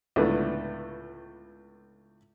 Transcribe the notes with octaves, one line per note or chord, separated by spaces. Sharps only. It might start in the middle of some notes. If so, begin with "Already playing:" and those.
C#2 A2 D3 A3 B3